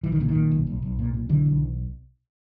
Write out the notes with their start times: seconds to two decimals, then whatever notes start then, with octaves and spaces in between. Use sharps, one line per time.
0.03 B1 E3
0.12 D#3
0.20 A#2 D3
0.29 D#3
0.35 A#2
0.51 B1
0.67 B1
0.82 B1
0.99 A#2
1.14 A#2
1.29 B1 D3 E3
1.46 B1